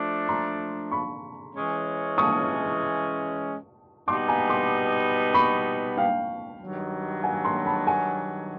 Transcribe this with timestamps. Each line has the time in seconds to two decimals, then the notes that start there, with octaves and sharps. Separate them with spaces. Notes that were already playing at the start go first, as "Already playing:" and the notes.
Already playing: F3 A3 D4
0.29 A#5 C6
0.91 B5 C#6
1.56 E3 G#3 C#4
2.18 C#6 D#6
4.08 B2 G3 B3 D#4 C6 D6
4.28 G#5 A#5
4.49 C6 D6
5.34 B5 C#6
5.97 F5 G5
6.60 G2 D#3 F#3
7.23 F#5 G#5
7.45 A#5 C6
7.66 A5 B5
7.87 F#5 G#5